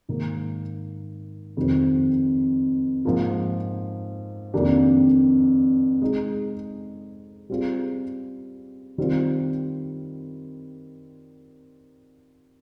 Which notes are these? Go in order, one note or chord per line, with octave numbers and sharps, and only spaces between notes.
G#2 D#3 A#3
F2 D#3 G3 C4
G#2 F3 A#3 F4
F2 D#3 A#3 D4 G4
G#3 D#4 G#4
G3 C4 F4 G#4
D#3 G3 C4 F4